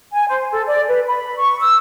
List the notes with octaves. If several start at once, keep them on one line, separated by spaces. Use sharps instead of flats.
G#5
C5
A4
D5
B4
B5
C#6
E6